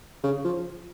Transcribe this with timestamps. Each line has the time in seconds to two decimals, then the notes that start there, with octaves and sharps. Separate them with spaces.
0.23 C#3
0.45 F3